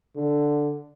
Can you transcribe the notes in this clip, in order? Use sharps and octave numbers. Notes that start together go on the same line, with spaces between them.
D3